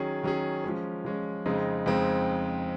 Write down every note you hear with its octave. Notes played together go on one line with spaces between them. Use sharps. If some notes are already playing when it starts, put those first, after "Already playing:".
Already playing: D#3 F#3 C#4 G#4
D#3 F#3 C#4 G#4
F3 G#3 C#4
F3 G#3 C#4
F2 C#3 G#3 C4 D#4
F2 C#3 G#3 C4 D#4